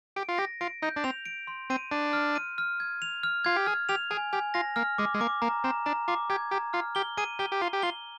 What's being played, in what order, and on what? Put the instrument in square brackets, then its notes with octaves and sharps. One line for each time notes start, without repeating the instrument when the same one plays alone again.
[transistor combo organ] G4 [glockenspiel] D7
[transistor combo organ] F4
[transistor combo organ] G4 [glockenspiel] A#6
[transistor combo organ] F4 [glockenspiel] D7
[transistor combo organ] D#4 [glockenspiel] G6
[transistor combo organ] D4
[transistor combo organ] C4 [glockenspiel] F7
[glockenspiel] D7
C6
[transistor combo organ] C4 [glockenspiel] D#7
[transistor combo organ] D4 [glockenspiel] D#7
[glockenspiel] F6
D#7
F6
G#6
F7
F6
[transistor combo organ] F4 [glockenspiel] G#6
[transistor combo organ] G4
[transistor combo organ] G#4 [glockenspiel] F6
[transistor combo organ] G4 [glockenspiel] F7
[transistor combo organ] G#4 [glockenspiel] G#5
[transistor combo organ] G4 [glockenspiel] G#5
[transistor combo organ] F4 [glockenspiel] A#6
[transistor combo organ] A#3 [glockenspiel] F6
[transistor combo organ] G#3 [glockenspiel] D6
[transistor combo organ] G#3
[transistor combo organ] A#3 [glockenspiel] D6
[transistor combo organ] A#3 [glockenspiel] A#5
[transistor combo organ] C4 [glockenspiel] A#5
[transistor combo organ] D4 [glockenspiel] A#5
[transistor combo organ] F4 [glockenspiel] D6
[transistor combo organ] G4 [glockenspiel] G#6
[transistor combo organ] G4 [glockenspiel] A#5
[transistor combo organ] F4 [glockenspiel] F6
[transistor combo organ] G4 [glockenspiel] G7
[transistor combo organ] G#4 [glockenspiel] D#7
[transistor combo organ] G4 [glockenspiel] G7
[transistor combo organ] G4
[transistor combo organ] F4 [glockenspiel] G7
[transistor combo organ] G4
[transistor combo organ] F4 [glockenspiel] G7